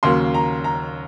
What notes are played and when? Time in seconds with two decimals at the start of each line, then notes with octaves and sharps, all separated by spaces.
0.03 D#2 C#3 F#3 A#3 C6
0.34 A#5
0.64 A#5